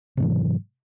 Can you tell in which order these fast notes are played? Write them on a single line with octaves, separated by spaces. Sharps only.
C3 G#2 E3 F#3